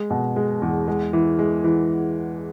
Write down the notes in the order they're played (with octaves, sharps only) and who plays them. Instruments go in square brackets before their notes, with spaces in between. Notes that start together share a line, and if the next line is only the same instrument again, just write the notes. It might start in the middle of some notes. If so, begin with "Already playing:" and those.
Already playing: [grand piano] G#3
B2
G#3
E2
G#3
E3
G#3
E3